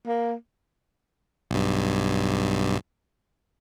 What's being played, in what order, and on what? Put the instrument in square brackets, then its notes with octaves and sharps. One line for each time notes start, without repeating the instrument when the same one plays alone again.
[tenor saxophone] A#3
[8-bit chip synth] B1 G2